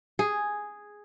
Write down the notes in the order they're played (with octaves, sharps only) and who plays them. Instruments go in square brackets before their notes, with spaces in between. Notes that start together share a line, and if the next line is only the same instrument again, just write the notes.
[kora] G#4